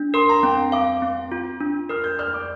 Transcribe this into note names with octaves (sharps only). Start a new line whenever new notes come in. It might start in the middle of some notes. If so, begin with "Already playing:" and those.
Already playing: D4
A#4 C6
A#5
C4 G5
F5 D6
C4
F4
D4
A#4 F6
G6
D5 F6
D6